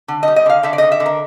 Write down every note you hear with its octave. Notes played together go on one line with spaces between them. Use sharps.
D3
D#5
G3
D#5
D3 F5
D3 E5
D5
D3 D#5
E5
D3
A#4